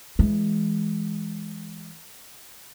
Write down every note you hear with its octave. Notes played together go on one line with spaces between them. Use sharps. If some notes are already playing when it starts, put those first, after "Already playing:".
E3 G#3